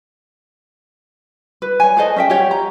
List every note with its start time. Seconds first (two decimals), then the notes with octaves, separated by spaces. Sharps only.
1.62 B4
1.80 C#5 G#5
1.97 G#4 A4 C5 D#5
2.16 C#4 E5 G5
2.30 G4 C#5 F#5
2.51 A#5